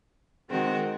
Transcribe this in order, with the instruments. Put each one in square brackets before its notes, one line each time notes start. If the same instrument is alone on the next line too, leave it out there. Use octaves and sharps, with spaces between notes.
[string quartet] D#3 G#3 C4 F#4